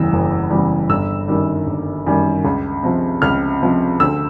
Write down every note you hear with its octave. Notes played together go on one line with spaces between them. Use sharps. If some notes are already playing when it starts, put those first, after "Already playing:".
Already playing: F#1 E2 C#3 E3 G3 E6
F#1
E2 C#3 E3 G3
G1 E6
F#2 D#3 G3
G1
F#2 D#3 G3
C#2
C3 F3
C#2 F6
C3 F3
D2 E6